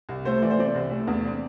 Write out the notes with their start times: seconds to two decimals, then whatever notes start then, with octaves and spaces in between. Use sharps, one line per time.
0.09 C2
0.25 A3 C5
0.42 E3 D5
0.50 C5
0.59 C3 D5
0.75 C2
0.91 A3
1.07 E2
1.25 C4